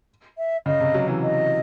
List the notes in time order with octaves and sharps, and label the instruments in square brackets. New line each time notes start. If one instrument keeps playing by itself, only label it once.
[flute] E5
[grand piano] C#3 [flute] D#5
[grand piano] C3
F#3
E3
[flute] D#5